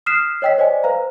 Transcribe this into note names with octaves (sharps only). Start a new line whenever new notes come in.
D#6 F6 F#6 B6 C7 E7
C#5 D#5 G5 E6 B6
C5 D5 D#5 G#5
B4 C5 F5 A#5